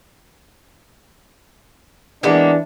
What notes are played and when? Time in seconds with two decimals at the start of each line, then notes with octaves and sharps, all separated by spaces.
2.23 E3 G#3 A#3 B3 D4